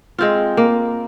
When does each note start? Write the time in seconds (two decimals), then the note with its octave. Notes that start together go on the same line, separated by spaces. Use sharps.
0.18 G#3 C4 F4
0.57 A#3